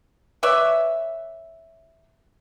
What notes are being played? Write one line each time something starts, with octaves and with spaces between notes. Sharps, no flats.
B4 C#5 D5 E5